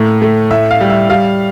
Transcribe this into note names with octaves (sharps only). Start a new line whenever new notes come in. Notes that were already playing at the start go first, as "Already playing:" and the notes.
Already playing: A2 A3 A#3
A3
A2 E5
F5
G3
E5
G3 F5